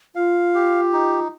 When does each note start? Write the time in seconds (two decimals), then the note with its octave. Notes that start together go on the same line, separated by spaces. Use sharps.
0.15 F4 F5
0.55 G4
0.93 D#4